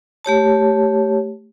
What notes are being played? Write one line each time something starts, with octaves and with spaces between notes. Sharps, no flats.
A3 G4 C#5 A5